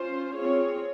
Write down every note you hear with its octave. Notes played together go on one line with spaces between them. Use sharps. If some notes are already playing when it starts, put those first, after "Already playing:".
Already playing: C#4 F4 C5
C4 F4 G#4 C#5